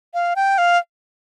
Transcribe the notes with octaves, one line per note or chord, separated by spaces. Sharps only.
F5
G5
F5